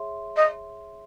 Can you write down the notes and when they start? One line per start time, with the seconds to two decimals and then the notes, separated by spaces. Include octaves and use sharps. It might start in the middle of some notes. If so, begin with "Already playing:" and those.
Already playing: G#4 C#5 E5 C6
0.36 D#5